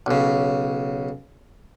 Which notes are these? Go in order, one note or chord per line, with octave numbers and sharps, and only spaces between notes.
B1 C#3